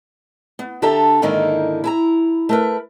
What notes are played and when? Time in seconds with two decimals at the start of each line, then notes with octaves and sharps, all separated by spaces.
0.59 B3
0.82 D3 D4 G4 A4 E5 A#5
1.22 G#2 D3 D#3 A#3 D#4 E4
1.84 E4 G#5 A#5
2.49 A3 A#4 B4